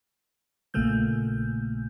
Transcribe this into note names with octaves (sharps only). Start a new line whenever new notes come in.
A#1 A#2 C#3 A3 A#3 G6